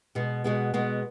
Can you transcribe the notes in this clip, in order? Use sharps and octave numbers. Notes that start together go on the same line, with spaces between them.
B2 G#3 B3
B2 G#3 B3
B2 G#3 B3